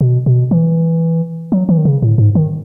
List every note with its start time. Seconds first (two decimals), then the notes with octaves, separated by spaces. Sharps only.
0.01 B2
0.26 B2
0.51 E3
1.52 F#3
1.69 E3
1.77 D#3
1.85 C#3
2.03 A2
2.18 G#2
2.35 D#3